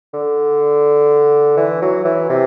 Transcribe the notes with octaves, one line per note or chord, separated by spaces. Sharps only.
D3
E3
F#3
E3
C3